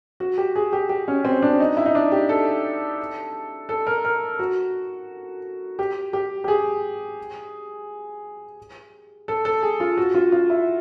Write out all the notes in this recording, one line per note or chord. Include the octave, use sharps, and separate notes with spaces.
F#4
G4
G#4
G4
G4
C#4
C4
D4
D#4
E4
D#4
D4
G4
A4
A4
A#4
A#4
F#4
G4
G4
G4
G#4
A4
A4
G#4
F4
F#4
F4
F4
E4